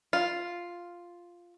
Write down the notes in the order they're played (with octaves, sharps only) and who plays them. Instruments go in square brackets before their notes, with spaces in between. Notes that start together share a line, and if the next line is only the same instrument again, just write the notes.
[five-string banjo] F4